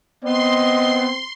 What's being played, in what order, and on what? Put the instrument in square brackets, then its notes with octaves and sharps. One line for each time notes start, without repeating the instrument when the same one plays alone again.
[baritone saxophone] B3 [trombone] C4 [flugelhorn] D#5 [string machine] C6